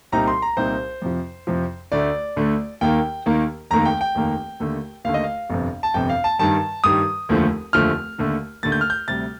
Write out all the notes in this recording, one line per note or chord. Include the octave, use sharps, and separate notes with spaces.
C2 A#2 G3 C4 D#4 A#5
C6
A#5
C2 A#2 G3 C4 D#4 C5
F2 C3 F3
F2 C3 F3
D2 D3 A3 D5
D2 D3 A3
D#2 D#3 A#3 G5
D#2 D#3 A#3
F1 D#2 D#3 A#3 A#5
G5
G5
F1 D#2 D#3 A#3
D#2 D3 A3
D#2 D3 A3 F5
D#5
F5
G1 F2 C3
A5
G1 F2 C3 G5
F5
A5
G2 D#3 G3 A5
G2 D#3 G3 D#6
F1 D#2 D3 F3 A3
F1 D#2 D3 F3 A3 F6
D#2 D3 A3
D#2 D3 A3 A6
G6
F6
G6
D2 C3 G3 A6